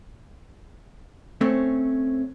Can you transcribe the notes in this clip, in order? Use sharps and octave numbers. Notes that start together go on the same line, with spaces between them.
A3 C4 C#4